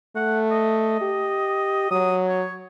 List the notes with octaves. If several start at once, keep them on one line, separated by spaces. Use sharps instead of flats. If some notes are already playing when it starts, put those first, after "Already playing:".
A3 F#5
D#5
G4
F#3 D#6
C#5